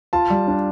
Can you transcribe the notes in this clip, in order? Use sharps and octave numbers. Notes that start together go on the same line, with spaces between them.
F4 A5
G3
D4